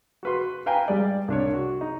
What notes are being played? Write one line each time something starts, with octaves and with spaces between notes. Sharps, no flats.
F#4 B4 C6
B4 F5 G5 G#5 A#5
G3 G#3 D5
C2 D4 C#5
F#4
D#4